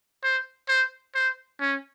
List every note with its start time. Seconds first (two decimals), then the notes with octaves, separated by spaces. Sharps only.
0.23 C5
0.68 C5
1.15 C5
1.61 C#4